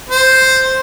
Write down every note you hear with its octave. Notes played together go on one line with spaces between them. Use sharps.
C5